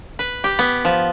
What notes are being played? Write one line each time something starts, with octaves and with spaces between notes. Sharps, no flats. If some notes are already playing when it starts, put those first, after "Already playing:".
B4
G4
B3
F3